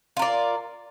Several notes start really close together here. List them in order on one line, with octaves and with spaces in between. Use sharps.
F4 A#4 D5